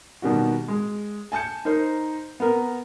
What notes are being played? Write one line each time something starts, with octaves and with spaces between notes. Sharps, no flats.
B2 D#3 G3 F#4
G#3
G#5 A5 G6 C#7
D#4 A#4 C5
B3 A#4